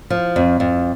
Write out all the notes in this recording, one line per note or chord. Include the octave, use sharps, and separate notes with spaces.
F3
F2
F2